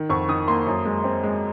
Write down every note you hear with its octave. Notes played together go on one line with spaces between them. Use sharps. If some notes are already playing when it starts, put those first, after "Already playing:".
Already playing: D#3
F2 C#6
D#3 D#6
A#3 C6
F#2
G#3
C4
G#3